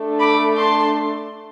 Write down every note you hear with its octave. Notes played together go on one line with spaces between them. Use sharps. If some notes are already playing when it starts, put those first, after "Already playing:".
Already playing: A3 D4 A4
B5 D6
A5 C6